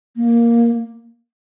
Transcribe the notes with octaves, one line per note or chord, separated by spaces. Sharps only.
A#3